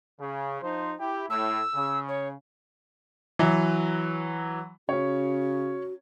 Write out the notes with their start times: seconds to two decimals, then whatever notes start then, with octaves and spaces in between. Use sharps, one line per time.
0.19 C#3
0.62 F3 D#4 C5
1.00 E4 G4
1.30 A2 E6
1.74 C#3
2.08 C#5
3.39 E3 F#3
4.89 C#3 C#4 F#4 C#5